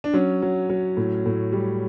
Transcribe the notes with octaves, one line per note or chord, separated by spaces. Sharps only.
D4
F#3 C#4
F#3
F#3
A2
A2
G3